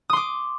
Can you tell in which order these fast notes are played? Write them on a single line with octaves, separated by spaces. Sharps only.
D#6 C6 D6